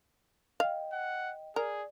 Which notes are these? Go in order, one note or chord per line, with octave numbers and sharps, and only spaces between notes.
D#5 F5 G5
F#5
G#4 A#4 D5